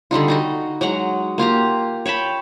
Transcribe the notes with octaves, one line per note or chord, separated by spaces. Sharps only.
D3 G3 D#4 F4
D#4 F#4 D#5
F#3 G#3 F#5 A#5
A#3 F4 G4 A#5
C#5 G5 A5 B5